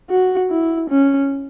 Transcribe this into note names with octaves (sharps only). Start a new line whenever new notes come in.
F#4
E4
C#4